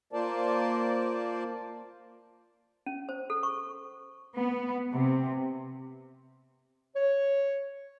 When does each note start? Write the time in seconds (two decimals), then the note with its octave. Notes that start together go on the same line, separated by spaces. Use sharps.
0.13 A#3 F4 A#4 C5 D5 A5
2.86 C#4
3.09 C5
3.30 A4
3.43 C#6
4.36 B3
4.93 C3
6.96 C#5